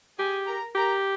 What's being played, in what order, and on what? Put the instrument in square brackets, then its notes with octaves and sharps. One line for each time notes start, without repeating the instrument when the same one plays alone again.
[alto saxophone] G4 [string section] G#4 G#5
[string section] A#4 A#5
[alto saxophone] G4 [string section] A#4 A#5